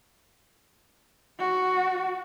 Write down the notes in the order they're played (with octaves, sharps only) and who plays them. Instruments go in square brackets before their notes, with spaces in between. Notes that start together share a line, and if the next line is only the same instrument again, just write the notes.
[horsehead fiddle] F#4